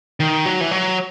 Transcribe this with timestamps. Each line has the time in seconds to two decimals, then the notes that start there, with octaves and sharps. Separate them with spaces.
0.20 D#3
0.46 F#3
0.61 E3
0.71 F#3